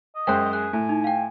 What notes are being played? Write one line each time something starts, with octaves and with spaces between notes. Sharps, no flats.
D#5
F#2 G#3 C5 G5 F#6
G#4 F#6
A2 G#5
D#4
F5 G5